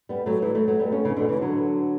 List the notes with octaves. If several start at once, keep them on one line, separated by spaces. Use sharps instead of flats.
G3 B3
F#3 A3
E3 G3
F#3 A3
F#3 A3
G3 B3
A3 C#4
C#3 E3
B2 D3
C#3 E3
D3 F#3